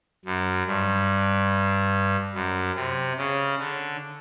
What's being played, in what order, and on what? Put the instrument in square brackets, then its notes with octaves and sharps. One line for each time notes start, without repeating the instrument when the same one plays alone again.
[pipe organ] F#2
G2
F#2
C3
C#3
D3